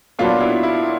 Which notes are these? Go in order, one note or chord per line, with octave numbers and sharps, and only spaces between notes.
A#2 F#3 B3 D4 F4
E4
E4